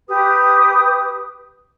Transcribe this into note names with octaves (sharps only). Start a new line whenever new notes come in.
G4 B4 D#6